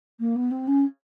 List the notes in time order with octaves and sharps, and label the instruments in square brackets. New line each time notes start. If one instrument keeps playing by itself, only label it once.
[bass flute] A#3
B3
C4
C#4